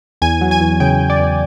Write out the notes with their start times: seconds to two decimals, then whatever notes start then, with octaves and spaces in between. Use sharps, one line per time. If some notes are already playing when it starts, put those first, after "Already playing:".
0.22 E2 G#5
0.41 F#3
0.51 G#5
0.61 E2
0.80 C#3 G5
1.00 C#3
1.10 D5
1.19 E2